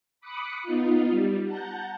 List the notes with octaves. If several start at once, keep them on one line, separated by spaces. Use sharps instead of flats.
B5 D6 D#6 F#6 C#7
B3 D#4 F4
G3
F#5 A5 A#5 G6